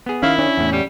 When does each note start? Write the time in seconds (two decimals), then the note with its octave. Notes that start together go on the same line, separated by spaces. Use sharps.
0.06 B3 G#4
0.23 D#3 C#4 E4 F5
0.38 C#4 D4
0.57 E2 A2
0.72 G3